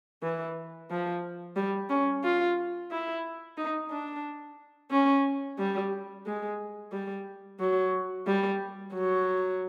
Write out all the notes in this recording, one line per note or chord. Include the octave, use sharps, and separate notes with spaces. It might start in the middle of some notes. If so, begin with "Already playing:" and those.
E3
F3
G3
C#4
F4
E4
D#4
D4
C#4
G3
G#3
G3
F#3
G3
F#3